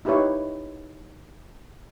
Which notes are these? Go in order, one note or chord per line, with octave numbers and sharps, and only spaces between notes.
D#4 E4 G4 B4 C#5